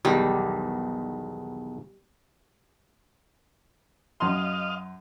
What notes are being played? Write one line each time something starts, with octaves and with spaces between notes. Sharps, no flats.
B1 E2 D#3 G3
F#2 D#5 F5 C6